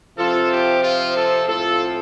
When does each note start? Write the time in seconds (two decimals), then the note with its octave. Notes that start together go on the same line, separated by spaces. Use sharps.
0.17 C3 F3 C4 F4 A4
0.50 G4
0.83 F4
1.16 A4
1.48 A2 F3 C4 F4 A4